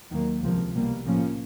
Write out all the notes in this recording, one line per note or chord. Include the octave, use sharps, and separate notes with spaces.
D#2 D#3 F#3 A#3
C#2 C3 F3 A#3
C2 B2 G3 A#3
A2 F3 A#3 C#4